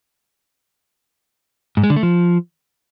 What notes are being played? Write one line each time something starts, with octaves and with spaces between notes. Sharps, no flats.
G#2
G#3
D3
A3
F3